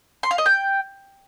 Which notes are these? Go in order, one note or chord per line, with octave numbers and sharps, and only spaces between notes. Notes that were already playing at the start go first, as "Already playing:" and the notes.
C6
F5
D#5
G5